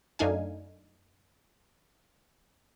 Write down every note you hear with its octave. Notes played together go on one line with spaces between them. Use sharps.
F#2 A3 D4 D#4 F5 G#5